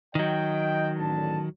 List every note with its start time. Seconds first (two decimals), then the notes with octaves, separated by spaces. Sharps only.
0.15 D#3 F#3 D#5 G5
0.98 A1 D3 A5